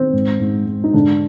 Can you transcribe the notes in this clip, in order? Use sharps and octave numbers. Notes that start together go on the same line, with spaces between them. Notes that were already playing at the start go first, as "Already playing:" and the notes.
Already playing: D#3 C4
G#2
G#2
G#2
D#4
G#2 D3 D4